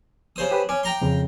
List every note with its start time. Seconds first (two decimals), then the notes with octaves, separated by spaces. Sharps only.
0.36 C#3 C5 D#6
0.51 G4 B4
0.69 C#4 D6
0.83 G5 A#5 C6
1.01 F2 C#3